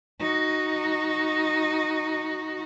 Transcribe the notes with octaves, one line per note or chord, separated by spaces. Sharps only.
D#4 F#4